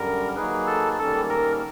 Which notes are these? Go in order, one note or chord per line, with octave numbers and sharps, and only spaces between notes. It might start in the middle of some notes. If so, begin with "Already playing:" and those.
Already playing: F#2 D3 G3 A#4
F#3 A#3 D#4 G#4 B4
A4
G#2 D#3 G3 A#3 C#4 A4
A#4